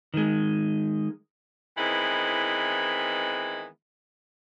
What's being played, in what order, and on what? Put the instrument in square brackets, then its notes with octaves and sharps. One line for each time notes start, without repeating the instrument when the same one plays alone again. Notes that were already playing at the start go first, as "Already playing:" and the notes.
[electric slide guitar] D#3 G#3
[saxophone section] D#3 E3 G#3 B3 C4 E4